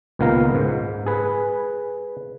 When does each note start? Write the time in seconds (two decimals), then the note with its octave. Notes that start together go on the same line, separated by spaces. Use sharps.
0.19 C#2 A#2 D#3 B3 F5 A#5
0.55 G#2
1.06 G#4 B4